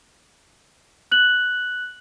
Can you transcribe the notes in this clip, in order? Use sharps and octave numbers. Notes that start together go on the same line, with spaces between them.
F#6 F#7